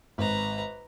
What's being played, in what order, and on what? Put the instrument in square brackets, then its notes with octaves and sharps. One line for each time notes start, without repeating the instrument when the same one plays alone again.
[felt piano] G#1 [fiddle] B4 A#5